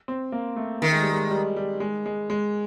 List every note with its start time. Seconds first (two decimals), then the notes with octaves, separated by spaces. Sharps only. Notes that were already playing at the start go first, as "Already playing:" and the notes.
0.08 C4
0.32 A#3
0.56 A3
0.82 D#3 A3
0.92 G#3
1.02 G3
1.13 G#3
1.31 G3
1.56 G3
1.80 G#3
2.06 G#3
2.30 G#3